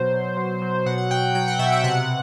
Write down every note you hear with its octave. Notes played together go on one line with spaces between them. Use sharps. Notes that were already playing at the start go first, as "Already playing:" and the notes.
Already playing: B2 F#3 C5
B2
F#3
F#3
B2 F#5
F#5
B2 G5
F#3 G5
F#5
B2 E5
E5
C3 F#5